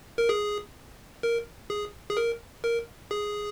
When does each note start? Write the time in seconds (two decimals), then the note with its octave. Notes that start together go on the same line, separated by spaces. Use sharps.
0.18 A#4
0.29 G#4
1.23 A#4
1.70 G#4
2.10 G#4
2.17 A#4
2.64 A#4
3.11 G#4